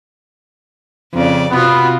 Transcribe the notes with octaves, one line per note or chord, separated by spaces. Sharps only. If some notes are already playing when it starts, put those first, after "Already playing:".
F2 C#3 D5
C3 B3 F4 F#4